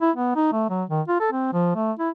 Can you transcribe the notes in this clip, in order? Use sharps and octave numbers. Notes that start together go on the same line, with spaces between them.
E4
B3
D#4
A3
F#3
D#3
F4
A4
C4
F3
A3
E4